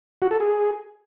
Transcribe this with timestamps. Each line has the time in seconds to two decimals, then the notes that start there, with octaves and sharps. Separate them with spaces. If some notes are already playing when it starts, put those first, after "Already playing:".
0.22 F#4
0.31 A4
0.40 G#4